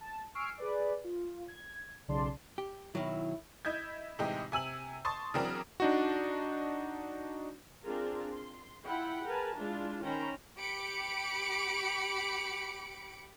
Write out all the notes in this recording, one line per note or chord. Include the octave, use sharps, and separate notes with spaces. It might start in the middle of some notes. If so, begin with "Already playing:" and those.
A5
G#5 C#6 E6 F6 C7 D7
G#4 B4 D5
F4
G#6
B1 C#3 D5 A5 C6
G4
B2 D#3 F#3 E4
E4 D#5 G6 G#6
A2 C3 E3 G#3 D#4 G4
C3 G#5 E6 F#7
A5 C6 C#6 D#6 A6
C#3 E3 F#3 C4 D4 A#4
D4 D#4 F#4
C4 D4 F4 G#4 A#4
C6
E4 F4 F#5 G5 B5
G#4 A#4 B4 G#5 A5
G#3 D4 E4 F4
D#3 C#4 C5 G5 A#5 B5
G4 B5 D6 C#7 D7